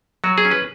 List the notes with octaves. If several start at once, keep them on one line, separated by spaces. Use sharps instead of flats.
F#3 F#4
G#4
C#4
B4